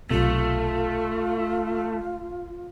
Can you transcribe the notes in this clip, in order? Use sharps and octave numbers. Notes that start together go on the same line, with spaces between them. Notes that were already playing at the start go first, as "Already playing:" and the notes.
B1 C3 A3 F4